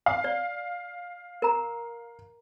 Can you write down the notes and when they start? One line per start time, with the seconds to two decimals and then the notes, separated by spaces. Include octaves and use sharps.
0.06 F5
0.24 D5
1.42 A#4 A#5